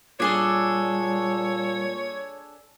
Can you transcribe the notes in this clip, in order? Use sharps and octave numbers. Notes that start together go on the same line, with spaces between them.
A#2 G3 D4 G#4 A4 C#5